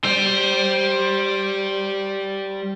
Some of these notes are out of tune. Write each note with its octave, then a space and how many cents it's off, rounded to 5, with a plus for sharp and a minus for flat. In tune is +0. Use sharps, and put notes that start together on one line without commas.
G3 -10 C5 +15